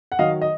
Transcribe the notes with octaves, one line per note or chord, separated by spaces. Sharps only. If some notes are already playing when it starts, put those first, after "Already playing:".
F#5
D#3 F#3 D#5 F5
D#5